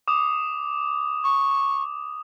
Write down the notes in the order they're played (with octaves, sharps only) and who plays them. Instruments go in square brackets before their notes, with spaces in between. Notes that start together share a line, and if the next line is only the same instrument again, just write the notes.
[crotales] D6 D#6
[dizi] C#6